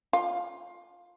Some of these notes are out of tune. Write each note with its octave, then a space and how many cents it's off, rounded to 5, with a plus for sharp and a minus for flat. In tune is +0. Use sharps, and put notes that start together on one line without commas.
F4 +10